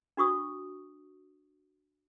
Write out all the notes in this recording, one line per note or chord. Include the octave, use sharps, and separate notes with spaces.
D4 F#4 C#6 D#6